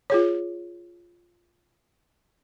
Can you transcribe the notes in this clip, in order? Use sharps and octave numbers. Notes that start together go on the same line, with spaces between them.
F4 G#4 C#5